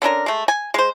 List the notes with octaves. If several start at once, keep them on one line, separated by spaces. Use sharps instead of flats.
D3 C#4 D4 A#4
G#3 A3
G#5
G#3 C5